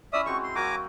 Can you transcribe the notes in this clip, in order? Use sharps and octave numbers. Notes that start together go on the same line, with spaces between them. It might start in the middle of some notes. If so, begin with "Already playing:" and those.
C#4 E4 D5 E5 A#5 D#6
G#3 C4 F#4 C#6
C6
F#3 A#3 F#4 G#5 A#5 D6